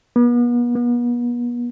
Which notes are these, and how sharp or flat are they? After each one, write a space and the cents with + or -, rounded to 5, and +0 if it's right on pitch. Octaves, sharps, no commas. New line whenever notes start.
B3 -40
B3 -40